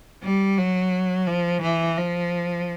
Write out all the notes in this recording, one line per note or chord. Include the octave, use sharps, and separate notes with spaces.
G3
F#3
F3
E3
F3